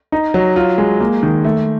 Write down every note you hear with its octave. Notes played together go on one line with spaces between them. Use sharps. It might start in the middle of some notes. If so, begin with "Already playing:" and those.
D#4
F#3
F4
G#3
A#3
D#3
A3